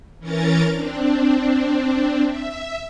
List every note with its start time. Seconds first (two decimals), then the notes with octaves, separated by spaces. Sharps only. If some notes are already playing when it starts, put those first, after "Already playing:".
0.19 E3 C#4 A#4 A#5 A6
0.72 C4 D4
2.25 E5